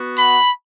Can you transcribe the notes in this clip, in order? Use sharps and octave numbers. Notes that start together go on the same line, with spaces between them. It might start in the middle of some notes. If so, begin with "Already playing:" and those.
Already playing: B3 F#4
B5